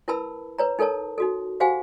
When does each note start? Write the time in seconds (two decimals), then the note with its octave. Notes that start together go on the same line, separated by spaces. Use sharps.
0.08 E4 A#4 B4 A5 B5 E6
0.59 B4 C#5 A#5
0.79 D#4 A4 A#4 C#5 A5
1.18 D#4 F#4 A4
1.60 F#4 G4 C5 F5 F#5 G#5